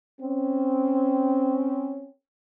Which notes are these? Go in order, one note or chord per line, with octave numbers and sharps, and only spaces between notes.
C4 C#4